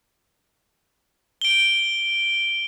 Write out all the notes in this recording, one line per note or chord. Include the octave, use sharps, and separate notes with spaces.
D7 G7